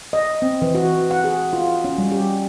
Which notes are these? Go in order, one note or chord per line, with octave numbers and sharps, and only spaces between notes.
D#5
C4
E3
F#4
F#5
G#4
F4
C#4
G3
G4